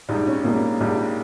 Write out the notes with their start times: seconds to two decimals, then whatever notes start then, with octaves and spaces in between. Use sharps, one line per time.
0.09 A#1 G#2 G3 D#4
0.27 C#4
0.44 A#1 G#2 G3 A#3
0.80 A#1 G#2 G3